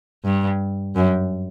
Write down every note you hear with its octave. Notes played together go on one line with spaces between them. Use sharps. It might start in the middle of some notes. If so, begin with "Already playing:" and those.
G2
F#2